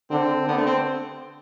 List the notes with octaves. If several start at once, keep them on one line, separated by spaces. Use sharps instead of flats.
D3 C4
D3 B3
A3
C4